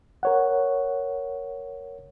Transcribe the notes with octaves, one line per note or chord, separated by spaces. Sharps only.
A#4 C#5 F#5